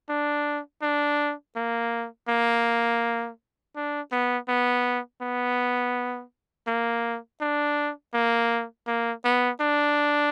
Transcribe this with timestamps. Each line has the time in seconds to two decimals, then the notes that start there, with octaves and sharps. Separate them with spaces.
0.09 D4
0.82 D4
1.56 A#3
2.28 A#3
3.76 D4
4.12 B3
4.48 B3
5.21 B3
6.67 A#3
7.41 D4
8.14 A#3
8.87 A#3
9.24 B3
9.61 D4